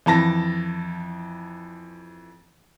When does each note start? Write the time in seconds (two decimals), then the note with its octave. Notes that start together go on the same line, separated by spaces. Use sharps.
0.06 F2 E3 A5 A#6